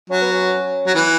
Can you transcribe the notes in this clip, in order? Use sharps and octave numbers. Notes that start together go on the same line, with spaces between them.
F#3 C#4
B3
C#4
F#3
E3 B3